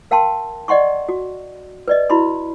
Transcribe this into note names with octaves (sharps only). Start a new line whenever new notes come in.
A#4 F5 G5 A5 C6
D5 D#5 F#5 C6 C#6
F#4
B4 D5 D#5
E4 F#4 B5 C6